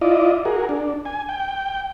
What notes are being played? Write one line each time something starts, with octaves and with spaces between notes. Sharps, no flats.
E4 F4 D5 D#5
F#4 G#4 A#4
D4
G#5
G5